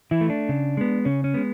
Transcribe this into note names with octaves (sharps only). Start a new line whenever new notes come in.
E3 E4
A3
D4
C#3
G#3 B3
C#3 C#4
C#4
G#3 B3